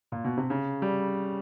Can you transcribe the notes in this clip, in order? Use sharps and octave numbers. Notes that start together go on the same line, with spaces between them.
A#2
B2
C3
C#3
G3